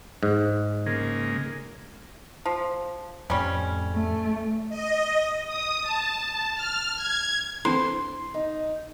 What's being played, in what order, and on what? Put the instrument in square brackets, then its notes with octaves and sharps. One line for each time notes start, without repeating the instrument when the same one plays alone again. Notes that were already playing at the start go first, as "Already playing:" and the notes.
[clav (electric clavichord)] G#2
[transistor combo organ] C#3 G#3 A#3
[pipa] F3
[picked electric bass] F2 A2 [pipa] G3 C#4
[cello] A3
[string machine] D#5
D#6
A5
F6
G#6
[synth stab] D3 E3 C4 [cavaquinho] C6
[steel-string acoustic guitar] D#4